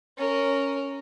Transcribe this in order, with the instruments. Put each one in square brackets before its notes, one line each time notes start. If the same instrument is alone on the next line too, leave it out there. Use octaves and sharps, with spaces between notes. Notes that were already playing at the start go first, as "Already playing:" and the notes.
[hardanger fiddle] C#4 A#4